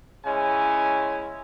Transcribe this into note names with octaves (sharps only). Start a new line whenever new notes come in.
C#3 G#3 C#4 E4 G#5